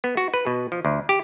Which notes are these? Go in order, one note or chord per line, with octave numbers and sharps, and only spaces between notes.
B3
F#4
B4
B2
F3
D2
G4